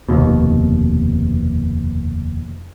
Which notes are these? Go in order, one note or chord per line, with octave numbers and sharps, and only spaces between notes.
F1 D#2 B2